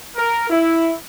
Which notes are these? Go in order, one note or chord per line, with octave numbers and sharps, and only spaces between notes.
A#4
E4